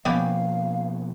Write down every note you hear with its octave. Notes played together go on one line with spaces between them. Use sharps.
B2 F3 A#3 B3 C#4 G4 F5